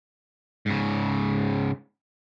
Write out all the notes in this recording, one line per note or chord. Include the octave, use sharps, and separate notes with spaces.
G#2 C#3